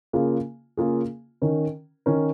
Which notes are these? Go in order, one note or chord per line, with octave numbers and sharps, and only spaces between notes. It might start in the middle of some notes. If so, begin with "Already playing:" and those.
C#3 A#3 F4 G#4
C#3 A#3 F4 G#4
D#3 C#4 A#4
D#3 C#4 A#4